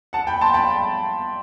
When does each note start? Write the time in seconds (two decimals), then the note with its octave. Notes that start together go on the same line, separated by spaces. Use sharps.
0.13 F#5 A5
0.27 G5 B5
0.41 A5 C6
0.54 G5 B5